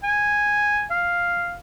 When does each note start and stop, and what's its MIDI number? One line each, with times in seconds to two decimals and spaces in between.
0.04 0.84 80
0.91 1.56 77